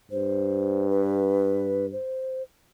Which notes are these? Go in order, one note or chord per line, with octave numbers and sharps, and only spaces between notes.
G2 C5
B4
C5